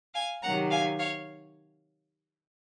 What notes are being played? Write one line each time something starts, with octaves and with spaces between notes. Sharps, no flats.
F5 G#5
C3 D#3 F#3 F#5 A#5
F5 G#5
C#5 F5